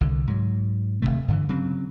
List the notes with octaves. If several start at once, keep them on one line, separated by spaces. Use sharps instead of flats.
C2 D3
G#2 F#3
D1 D#2 C3 A3
G2 D3 E3
C#3 F#3 C4